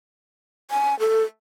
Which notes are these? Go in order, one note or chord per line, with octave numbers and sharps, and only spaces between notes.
G#5
A4